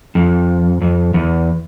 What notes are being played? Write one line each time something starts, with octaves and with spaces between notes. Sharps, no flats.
F2
F2
E2